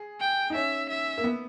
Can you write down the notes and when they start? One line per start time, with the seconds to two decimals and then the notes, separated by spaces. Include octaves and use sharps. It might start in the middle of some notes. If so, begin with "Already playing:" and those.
Already playing: G#4
0.21 G5
0.50 D#4
0.54 C#4 E5
0.90 E5
1.18 A#3
1.24 B3